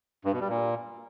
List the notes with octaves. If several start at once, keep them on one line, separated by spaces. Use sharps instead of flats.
G2
B2
G3
A#2